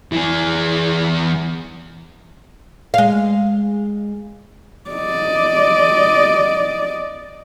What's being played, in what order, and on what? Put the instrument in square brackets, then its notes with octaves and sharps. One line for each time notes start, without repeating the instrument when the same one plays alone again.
[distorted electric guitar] E3 G#4
[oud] G#3 F5
[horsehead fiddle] D5 D#5